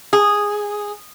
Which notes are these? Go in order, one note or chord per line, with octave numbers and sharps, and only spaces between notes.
G#4